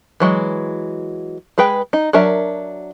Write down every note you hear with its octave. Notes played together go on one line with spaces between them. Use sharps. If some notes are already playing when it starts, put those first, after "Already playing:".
E3 F#3 G#3
G#3 G#4 B4 G5
D#4
F#3 D4 A#4 E5